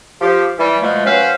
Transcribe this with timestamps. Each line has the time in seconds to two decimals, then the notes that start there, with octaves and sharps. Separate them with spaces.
0.21 F3 G4
0.59 E3 G3
0.82 B2 F3 G#3 A3
1.06 F#3 C#4 B4 C5 F5